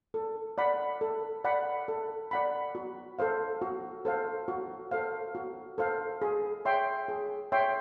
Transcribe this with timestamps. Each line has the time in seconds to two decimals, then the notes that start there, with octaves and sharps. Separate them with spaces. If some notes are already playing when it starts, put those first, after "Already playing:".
0.14 A4
0.58 D5 F#5 B5
1.01 A4
1.44 D5 F#5 B5
1.88 A4
2.31 D5 F#5 B5
2.75 F#4
3.19 A4 C5 F5
3.62 F#4
4.05 A4 C5 F5
4.48 F#4
4.91 A4 C5 F5
5.35 F#4
5.78 A4 C5 F5
6.22 G#4
6.65 C#5 E5 G5 C6
7.08 G#4
7.52 C#5 E5 G5 C6